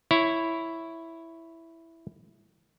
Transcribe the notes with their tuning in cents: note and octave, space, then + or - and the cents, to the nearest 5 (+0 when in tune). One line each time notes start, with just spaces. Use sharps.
E4 +0 C#5 +0